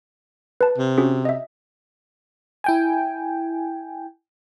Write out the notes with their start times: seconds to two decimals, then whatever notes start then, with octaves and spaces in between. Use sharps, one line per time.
0.61 B4 A5
0.78 C3
0.98 C#4 F#4 G#4
1.25 D#5 E5
2.64 E4 G5 G#5